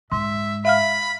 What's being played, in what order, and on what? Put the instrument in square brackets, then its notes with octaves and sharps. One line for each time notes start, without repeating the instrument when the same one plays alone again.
[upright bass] G#2 [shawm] E5 [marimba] C6
[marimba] E5 F5 F6 [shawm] B5